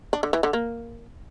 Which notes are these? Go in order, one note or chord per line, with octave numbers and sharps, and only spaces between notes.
D4
D3
E3
D3
A#3